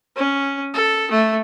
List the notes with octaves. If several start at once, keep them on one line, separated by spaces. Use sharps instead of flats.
C#4
A4
A3